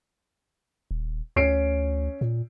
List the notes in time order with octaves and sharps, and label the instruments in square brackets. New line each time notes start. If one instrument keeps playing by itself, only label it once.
[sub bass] D#1
[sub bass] D2 [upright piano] C#4 C7 D7
[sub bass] A#2